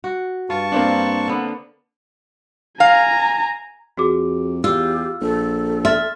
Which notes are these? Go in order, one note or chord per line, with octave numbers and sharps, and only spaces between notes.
F#4
G2 F4 A5 C#6
A#3 C4 D4
D3 B3
F5 G#5 A#5
F2 F#4 G#4 D6
E2 F4 G4 E6
A#1 A4
E5 C6 F6 A6